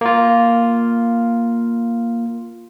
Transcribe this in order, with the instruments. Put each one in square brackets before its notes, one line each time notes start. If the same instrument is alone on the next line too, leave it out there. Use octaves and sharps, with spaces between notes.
[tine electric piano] A#3 F4